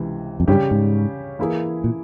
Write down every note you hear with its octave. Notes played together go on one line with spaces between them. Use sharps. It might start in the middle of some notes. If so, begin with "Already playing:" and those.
Already playing: C#2 C3 E3
F2
G2 C#3 G3 C#4 G4
G#2
E3 A#3 E4 G#4
A#2